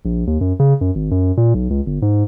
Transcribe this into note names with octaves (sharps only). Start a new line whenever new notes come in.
A#1
D#2
F#2
C#3
F#2
G#1
F#2
A#2
B1
C#2
G1
G#2